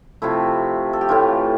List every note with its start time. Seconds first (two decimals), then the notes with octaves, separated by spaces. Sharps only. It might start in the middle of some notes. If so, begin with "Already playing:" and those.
0.22 C3 F3 A3 E4
0.93 A4
1.01 G4
1.09 A2 E3 A3 F4